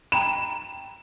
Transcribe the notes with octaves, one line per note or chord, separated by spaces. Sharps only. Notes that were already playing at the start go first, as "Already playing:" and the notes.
G5 A#5 B5 E7